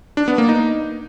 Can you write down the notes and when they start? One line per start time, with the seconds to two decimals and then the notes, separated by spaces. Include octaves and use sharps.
0.17 D4
0.28 B3
0.38 A#3
0.49 D#4